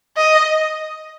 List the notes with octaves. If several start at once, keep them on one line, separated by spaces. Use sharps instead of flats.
D#5